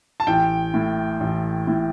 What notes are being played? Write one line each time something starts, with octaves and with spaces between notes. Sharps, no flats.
A5
A1 G5
A2
A1
A2